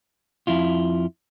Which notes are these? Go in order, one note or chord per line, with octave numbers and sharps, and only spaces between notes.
F2 E4 F4